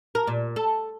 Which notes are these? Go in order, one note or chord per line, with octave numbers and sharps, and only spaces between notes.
A#4
A#2
A4